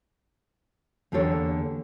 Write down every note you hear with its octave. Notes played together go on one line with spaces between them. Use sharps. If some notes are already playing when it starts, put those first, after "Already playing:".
E2 D3 A#3 G4 A4 C#5